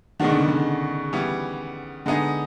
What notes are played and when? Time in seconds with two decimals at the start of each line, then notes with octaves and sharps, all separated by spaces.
0.20 B2 D#3 G#3 B3 D4 F#4
0.30 D3
0.40 C#3
0.48 D3
1.13 E3 G3 B3
2.06 D3 G#3 B3 D#4 G#4